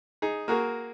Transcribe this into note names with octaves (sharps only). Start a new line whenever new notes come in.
D#4 G#4
A#3 F#4 G#4 A#4